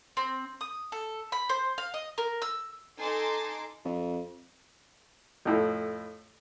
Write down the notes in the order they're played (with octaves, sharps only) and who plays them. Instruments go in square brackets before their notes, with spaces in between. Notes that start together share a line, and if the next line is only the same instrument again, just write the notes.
[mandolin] C4
D#6
A4
B5
C5
F5
D#5
A#4
E6
[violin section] D#4 A4 G#5 A5 C6 D6
[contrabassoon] F2
[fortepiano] F2 A2